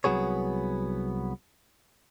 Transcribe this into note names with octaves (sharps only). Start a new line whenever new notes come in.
C2 C#3 F#3 B3 G#4 C#5